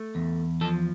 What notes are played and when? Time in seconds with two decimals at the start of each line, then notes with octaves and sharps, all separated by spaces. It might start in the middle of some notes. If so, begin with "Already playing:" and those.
Already playing: A3
0.15 E2
0.61 F3 A4